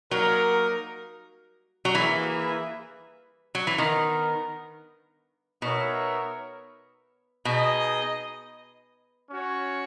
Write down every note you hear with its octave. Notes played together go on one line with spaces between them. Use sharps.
F#3 A#3 D#4 A#4
F#3
E3 A#3 E4 G#4 B4 E5
F#3
E3
D#3 B3 D#4 A#4
B2 B3 D#4 A#4 C#5 E5
B2 D#4 G#4 D#5
C#4 F#4 C#5